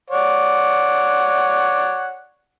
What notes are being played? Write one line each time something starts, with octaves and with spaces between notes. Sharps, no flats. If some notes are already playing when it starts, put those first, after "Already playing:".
C#5 D5 F#5